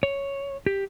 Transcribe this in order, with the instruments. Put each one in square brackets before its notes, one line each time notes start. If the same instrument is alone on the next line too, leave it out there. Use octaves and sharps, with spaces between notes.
[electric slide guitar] C#5
G4